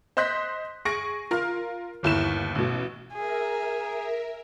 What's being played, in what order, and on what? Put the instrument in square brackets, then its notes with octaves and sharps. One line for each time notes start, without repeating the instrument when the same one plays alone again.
[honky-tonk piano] C5 D#5 C6 F#6 G6 B6
G#4 C#6 A#6 C#7 D7
F4 A#4 F6
G1 D#2 E4 E7
A1 B2
[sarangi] G#4 [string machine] A#4 E5